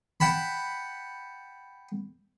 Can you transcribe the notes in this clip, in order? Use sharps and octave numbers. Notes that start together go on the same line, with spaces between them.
F#5 G5 A5 B5